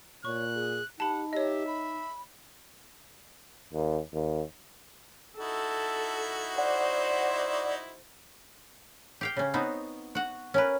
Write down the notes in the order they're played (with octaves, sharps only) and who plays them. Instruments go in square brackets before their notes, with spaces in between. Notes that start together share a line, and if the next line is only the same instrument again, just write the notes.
[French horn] A#2 [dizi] C#5 [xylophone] C#6 [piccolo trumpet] F#6
[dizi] G#4
[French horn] D#4 [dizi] G4 [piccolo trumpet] F#5 [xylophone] A5 B5
[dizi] G4 [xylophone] C#5 D#5 [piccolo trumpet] E5
[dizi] B5
[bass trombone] D#2
D#2
[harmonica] D#4 E4 F#4 [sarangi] A4
[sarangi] C5 [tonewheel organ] D5 [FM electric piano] F#5
[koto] G4 F5 G5
C#3 C#4
B3 C4 D#4 F#4
F#4 F#5
C#4 A#4 B4